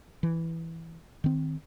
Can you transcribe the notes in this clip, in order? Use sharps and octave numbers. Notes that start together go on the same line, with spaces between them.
E3
D#3 C4